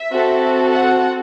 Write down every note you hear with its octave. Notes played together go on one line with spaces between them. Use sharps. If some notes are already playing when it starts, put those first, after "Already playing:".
Already playing: E5
C4 F#4 A4
F#5